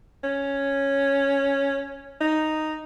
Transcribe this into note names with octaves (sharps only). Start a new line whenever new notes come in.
C#4
D#4